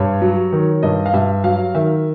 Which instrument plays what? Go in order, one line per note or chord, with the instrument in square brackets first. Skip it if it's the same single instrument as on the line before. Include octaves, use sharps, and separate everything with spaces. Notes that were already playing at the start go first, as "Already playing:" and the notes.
Already playing: [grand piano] G2 C#5
F#3
D#3
G2 D#5
F5
G2 E5
F#3 F5
D#3 E5